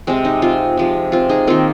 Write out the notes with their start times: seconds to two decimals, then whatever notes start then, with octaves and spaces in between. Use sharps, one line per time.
0.07 C3 G#3 C4
0.25 D#4
0.42 C4 F4
0.77 C3 F3 G#3
1.12 C4 F4
1.29 D#4 G#4
1.47 D#3 A#3 C4 F4